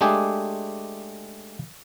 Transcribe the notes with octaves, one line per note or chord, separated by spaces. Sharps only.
G#3 A3 D4 G4 G#4